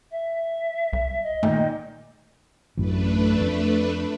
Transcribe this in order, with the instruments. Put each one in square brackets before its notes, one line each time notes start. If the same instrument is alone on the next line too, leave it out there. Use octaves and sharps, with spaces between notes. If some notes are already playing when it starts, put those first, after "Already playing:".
[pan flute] E5
[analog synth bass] C2
[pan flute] D#5
[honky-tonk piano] A#2 D#3 [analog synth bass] A3
[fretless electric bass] A1 F#2 [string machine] A3 D4 B4
[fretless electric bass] F2